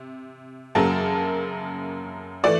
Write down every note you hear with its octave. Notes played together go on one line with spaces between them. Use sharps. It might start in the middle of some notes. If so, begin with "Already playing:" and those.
Already playing: C3
F#2 C#3 F#3 A#3 A5
E3 A3 D5